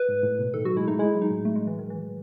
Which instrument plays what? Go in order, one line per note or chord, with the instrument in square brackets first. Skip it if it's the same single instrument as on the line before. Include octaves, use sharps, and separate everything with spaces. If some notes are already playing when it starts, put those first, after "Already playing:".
Already playing: [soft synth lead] B4
[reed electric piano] G#2
A2
B2
[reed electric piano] D#3 [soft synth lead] A4
[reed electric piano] F#3 [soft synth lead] F#4
[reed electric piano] G#3 [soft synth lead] E4
[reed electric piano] A3 [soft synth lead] D#4
[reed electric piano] G#3 [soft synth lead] E4
[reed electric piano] F#3
[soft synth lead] D#4
[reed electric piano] A2
[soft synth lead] A3
G#3
E3
D#3
E3